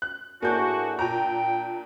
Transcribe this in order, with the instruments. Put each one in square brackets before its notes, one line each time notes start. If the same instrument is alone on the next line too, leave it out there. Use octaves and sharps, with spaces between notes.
[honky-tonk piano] F#6
[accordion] A2 D4 G#4 [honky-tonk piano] A#3 G6 [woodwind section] F#4
[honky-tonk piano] A#2 A#5 [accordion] D4 [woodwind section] G5